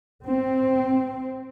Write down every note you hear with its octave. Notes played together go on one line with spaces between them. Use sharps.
C4